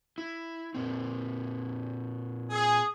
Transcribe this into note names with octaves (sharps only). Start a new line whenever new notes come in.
E4
A#2 C4
G#4